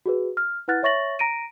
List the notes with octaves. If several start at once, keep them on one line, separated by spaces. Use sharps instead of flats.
F#4 G#4 B4
F6
E4 B4 F#5 F6 F#6 A6
C#5 E5 C#6 A6 A#6 F#7
A#5 A#6 D7 D#7